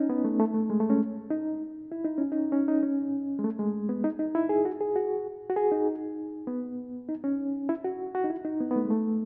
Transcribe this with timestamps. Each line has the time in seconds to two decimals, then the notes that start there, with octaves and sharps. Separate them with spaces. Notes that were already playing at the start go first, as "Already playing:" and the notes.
Already playing: C#4 D#4
0.10 B3
0.25 A3
0.39 A3
0.54 A3
0.70 G#3
0.80 A3
0.90 C#4
1.30 D#4
1.92 E4
2.05 D#4
2.18 C#4
2.32 D#4
2.52 C#4
2.68 D#4
2.83 C#4
3.39 G#3
3.44 A3
3.59 G#3
3.89 B3
4.04 D#4
4.19 D#4
4.35 E4
4.49 G#4
4.65 F#4
4.81 G#4
4.96 F#4
5.50 F#4
5.56 G#4
5.72 D#4
6.47 B3
7.09 D#4
7.24 C#4
7.69 E4
7.84 F#4
8.15 F#4
8.24 D#4
8.30 E4
8.45 D#4
8.60 B3
8.71 B3
8.76 A3
8.85 G#3
8.90 A3